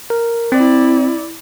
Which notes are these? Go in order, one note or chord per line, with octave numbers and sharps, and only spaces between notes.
A#4
C4 E4 D5